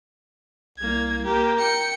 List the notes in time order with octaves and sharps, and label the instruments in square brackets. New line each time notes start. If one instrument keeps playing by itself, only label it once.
[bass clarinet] C2 [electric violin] A#3 G#6
[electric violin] A#3 G4 [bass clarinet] A#4
[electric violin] G5 C#7